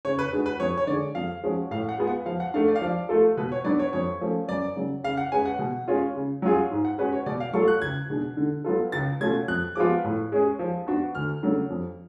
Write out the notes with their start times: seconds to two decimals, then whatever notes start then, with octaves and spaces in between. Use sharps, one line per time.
0.05 C#3 C#5
0.19 B4
0.32 G#3 D4 F#4
0.46 B4
0.60 F2 C#5
0.77 C#5
0.87 D3 D5
0.92 G#3
1.15 F2 F5
1.44 F3 G#3 C#4 F#4
1.71 A2 F5
1.89 F#5
1.98 G#3 B3 F4
2.07 F#5
2.26 F3 F5
2.40 F#5
2.54 A3 D4 F5
2.68 D5
2.75 F5
2.82 F3 D5
3.09 A3 F4 A4
3.37 B2 B4
3.52 C#5
3.65 F#3 B3 D4 D5
3.79 C#5
3.93 F2 C#5
4.21 F3 A3 C#4
4.48 F#2 D5
4.76 C#3 F#3
5.04 C#3 F5
5.17 F#5
5.32 G#3 C#4 G#4 B4 G#5
5.45 F#5
5.59 B2
5.88 G#3 C#4 F4
6.15 C#3
6.42 F#3 C#4 F4 G#4
6.71 G#2
6.85 F#5
6.98 G#3 C#4 F#4 B4
7.12 C#5
7.26 B2 D5
7.40 F5
7.53 F#3 A3 F4 A4 C#6
7.68 F#6
7.82 C#2 G#6
8.10 B2 G#3 D4
8.37 D3
8.64 F#3 B3 F4 A4
8.92 C#2 A6
9.21 B2 A3 C#4 F4 G#6
9.48 F2 F#6
9.75 F3 G#3 B3 F4 D6
10.04 A2
10.32 G#3 C#4 G#4
10.59 F3
10.87 B3 D4 F#4
11.15 D2 F6
11.43 C#3 F#3 A3 D4
11.70 F2